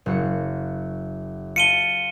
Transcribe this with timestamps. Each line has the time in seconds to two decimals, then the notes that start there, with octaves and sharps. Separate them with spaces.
0.06 F#1 F#4 C#7
1.56 F4 A5 C#7 D#7 G7